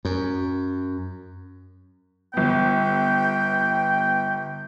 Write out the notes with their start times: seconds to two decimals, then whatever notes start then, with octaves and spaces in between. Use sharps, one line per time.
0.05 F#2
2.34 G1 B3 G5